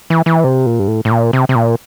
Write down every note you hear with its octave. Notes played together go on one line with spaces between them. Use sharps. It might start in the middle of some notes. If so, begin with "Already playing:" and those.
E3
E3
C3
A#2
G2
A2
A2
A#2
C3
C3
A#2